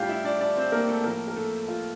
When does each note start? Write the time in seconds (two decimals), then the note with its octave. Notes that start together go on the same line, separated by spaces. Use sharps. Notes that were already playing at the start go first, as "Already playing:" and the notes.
Already playing: A2 G3 D4 F4 G4 F5 G5
0.08 E4 E5
0.24 D4 D5
0.40 D4 D5
0.56 C4 C5
0.72 A#3 A#4
0.88 A3 A4
1.04 A2 F3 A#3 A#4
1.28 A#4
1.36 A3 A4
1.68 F4